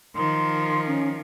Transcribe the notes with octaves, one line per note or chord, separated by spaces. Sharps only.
D#3 F3 C6
C#4